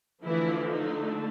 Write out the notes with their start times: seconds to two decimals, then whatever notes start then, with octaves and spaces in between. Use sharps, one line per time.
0.24 D3 E3 F3 A3 E4
0.69 D#4